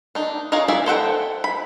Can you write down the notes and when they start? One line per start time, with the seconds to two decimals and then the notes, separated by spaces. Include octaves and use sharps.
0.15 D4 D#4
0.52 F4 G#4 A#4 C#5 D#5
0.68 E4 F4 D5 E5 G#5
0.86 A4 C5 F#5 G5
1.44 B5